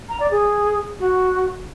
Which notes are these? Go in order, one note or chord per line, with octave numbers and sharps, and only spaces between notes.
A#5
D5
G#4
F#4